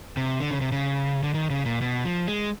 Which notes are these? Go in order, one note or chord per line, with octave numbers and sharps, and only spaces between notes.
C3
D3
C#3
C3
C#3
D3
D#3
C#3
A#2
B2
F3
G#3